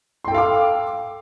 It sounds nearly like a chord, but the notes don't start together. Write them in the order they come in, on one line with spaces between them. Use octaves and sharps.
C6 G5 A4 F5 D6